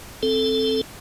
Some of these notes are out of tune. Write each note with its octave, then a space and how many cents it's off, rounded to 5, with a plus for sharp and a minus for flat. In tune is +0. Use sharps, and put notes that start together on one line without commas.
C4 +0 A4 +0